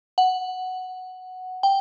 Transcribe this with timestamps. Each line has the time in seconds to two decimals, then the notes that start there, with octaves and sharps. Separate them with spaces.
0.18 F#5
1.63 G5